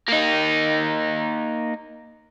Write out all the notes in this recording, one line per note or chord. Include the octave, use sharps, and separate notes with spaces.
A#3 D#4